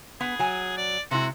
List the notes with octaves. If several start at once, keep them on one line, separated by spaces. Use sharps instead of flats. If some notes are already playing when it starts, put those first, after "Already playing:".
B3 G#4
F#3 G#5
D5
C3 G#3 E4 F#4